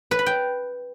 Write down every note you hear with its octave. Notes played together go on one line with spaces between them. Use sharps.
B4
B5
G5